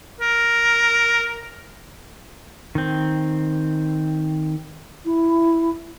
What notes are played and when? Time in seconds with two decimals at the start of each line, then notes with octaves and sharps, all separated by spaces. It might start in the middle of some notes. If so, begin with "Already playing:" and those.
0.21 A#4
2.75 D#3 C4
5.05 E4